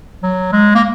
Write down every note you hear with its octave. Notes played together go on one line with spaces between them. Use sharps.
F#3
G#3
A#3